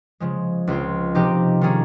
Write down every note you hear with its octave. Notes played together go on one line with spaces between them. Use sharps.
C#3 F3 G#3
C#2 C#3 F3 C4 F4
C3 F3 C4 D#4 G4
D#3 G3 A#3 C#4 G#4